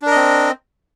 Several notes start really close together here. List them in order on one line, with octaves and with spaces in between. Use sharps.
D4 A#4 D#5 C4